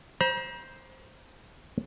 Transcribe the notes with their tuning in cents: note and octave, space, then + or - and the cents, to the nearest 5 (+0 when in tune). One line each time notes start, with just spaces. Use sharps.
C5 +0 A#5 +45